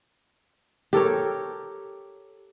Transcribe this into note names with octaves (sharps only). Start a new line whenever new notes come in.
G4 A4 A#4 C#5